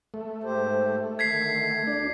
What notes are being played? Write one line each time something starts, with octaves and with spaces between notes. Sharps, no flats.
A3
G#2 G4 C5
D3 D#3 G#6 B6 C7
D2 D4